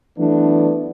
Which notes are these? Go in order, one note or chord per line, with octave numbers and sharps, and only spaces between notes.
E3 F#3 A3 B3 D4